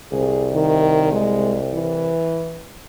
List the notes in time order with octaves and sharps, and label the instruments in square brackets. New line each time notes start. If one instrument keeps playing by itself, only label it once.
[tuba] C2 [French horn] G#4
[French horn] D#3
G#3
E3